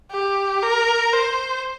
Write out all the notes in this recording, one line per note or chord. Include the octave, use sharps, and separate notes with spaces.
G4
A#4
C5